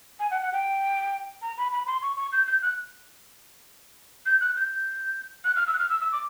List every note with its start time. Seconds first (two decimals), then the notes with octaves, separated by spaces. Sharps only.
0.20 G#5
0.31 F#5
0.42 F#5
0.53 G5
1.42 A#5
1.58 B5
1.72 B5
1.87 C6
2.02 C#6
2.17 C#6
2.32 G6
2.47 G6
2.62 F#6
4.26 G6
4.41 F#6
4.56 G6
5.45 F#6
5.56 F6
5.67 E6
5.73 F#6
5.79 F6
5.90 E6
6.01 E6
6.12 D6